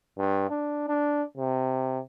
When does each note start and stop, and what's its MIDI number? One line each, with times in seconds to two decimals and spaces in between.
0.18 0.46 43
0.50 0.86 62
0.88 1.23 62
1.37 2.00 48